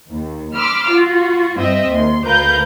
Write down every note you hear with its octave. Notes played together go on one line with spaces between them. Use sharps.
D#2
B5 C6 D6 E6 F6
F4 F#4
G2 C4 D#5 E5 E6
D#2 C6
D2 A#4 B4 F5 G6